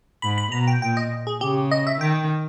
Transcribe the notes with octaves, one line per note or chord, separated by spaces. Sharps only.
G#2 B5
B5
B2 A#5
G5
A#2 G5
D#5
G#4
C#3 G4
D#5
E5
D#3 G5